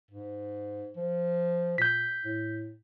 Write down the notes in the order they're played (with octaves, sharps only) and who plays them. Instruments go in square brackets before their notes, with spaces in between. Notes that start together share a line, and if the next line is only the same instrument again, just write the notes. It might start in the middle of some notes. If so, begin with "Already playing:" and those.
[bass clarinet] G#2
F3
[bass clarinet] A#2 [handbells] G6 B6
[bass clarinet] A2